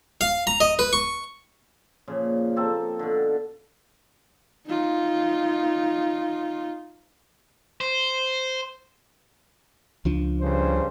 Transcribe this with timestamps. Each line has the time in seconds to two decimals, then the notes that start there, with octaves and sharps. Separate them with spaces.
0.21 F5
0.47 A#5
0.60 D#5
0.79 B4
0.93 C#6
2.08 A#2 C#3 F3
2.56 A#3 C4 A4
2.99 B2 D3
4.67 D#4 F4
7.81 C5
10.05 C#2 F3 D4
10.41 G2 C#3 C5